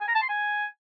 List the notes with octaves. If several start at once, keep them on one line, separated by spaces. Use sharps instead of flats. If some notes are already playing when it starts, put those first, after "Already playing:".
G#5
A#5
A5
C6
G#5